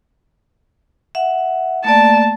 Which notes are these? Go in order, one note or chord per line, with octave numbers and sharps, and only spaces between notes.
E5 F#5
A3 A#3 D5 A5